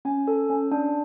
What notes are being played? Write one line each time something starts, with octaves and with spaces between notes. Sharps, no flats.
C#4 G#5
A4
C#4
D4